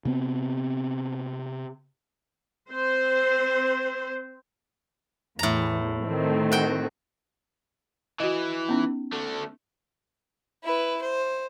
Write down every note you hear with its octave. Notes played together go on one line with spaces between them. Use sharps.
C3 B3 C4
C4 C5
E2 A2 A#5
D#3 A3 C4
F#4 G5
E3 E4 F#4 D#5
B3 C#4 D#4
D3 A3
E4 B4
C5